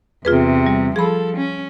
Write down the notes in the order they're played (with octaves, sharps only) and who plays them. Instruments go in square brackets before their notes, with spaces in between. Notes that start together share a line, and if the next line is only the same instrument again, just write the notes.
[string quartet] E2 C3 [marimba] F4 G#4 B4
[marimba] G3
[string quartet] F3 A4 [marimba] G#4 B5
[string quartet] C#4